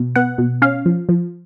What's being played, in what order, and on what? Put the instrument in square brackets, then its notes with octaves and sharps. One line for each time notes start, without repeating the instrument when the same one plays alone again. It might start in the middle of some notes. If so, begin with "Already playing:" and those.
Already playing: [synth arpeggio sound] B2
B3 F#5
B2
C#4 F5
F3
F3